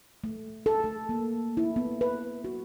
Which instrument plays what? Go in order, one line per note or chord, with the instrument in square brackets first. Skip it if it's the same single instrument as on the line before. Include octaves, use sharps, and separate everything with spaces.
[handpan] A3
A4
A3
A#3
E4
B3
B4
F#4